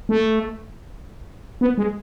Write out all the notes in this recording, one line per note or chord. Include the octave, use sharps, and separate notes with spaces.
A3
B3
G#3